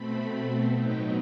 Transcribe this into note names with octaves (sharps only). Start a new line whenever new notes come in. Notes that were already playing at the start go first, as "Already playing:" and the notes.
Already playing: B2 A3 C4 B5
A2 F#3 B3 D#4 G5